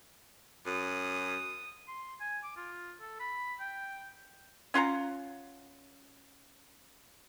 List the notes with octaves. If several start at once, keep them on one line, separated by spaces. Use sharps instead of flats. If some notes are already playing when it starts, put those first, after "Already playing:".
F#2 D#6
C6
G#5
D6
F4
A4
B5
G5
C#4 F4 F#5 A#5